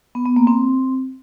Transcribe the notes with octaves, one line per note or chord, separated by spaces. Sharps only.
B3
B3
A#3
C4